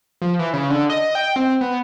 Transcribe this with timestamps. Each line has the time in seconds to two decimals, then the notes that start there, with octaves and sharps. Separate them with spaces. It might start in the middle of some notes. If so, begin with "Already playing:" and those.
0.22 F3
0.39 E3
0.53 C#3
0.70 D3
0.90 D#5
1.15 G5
1.36 C4
1.61 B3